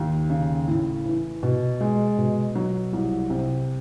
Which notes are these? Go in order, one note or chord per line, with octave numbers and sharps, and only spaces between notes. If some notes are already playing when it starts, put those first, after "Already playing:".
Already playing: D#2
C#3
A2
E3
B2
G#3
B2
F#3
C2
C3